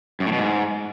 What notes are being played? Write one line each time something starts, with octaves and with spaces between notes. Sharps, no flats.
F#2
A2
B2
G#2